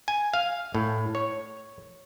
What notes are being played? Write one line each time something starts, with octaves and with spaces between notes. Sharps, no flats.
G#5
F5
A2
C#5